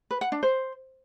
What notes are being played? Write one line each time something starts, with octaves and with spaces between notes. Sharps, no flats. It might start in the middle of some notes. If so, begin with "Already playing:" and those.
B4
F#5
D4
C5